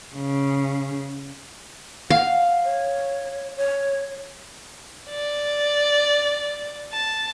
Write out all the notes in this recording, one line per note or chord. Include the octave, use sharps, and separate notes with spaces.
C#3
F5 F#5
C#5
C#5
D5
A5